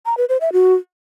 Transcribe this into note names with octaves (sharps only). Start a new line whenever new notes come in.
A#5
B4
C5
E5
F#4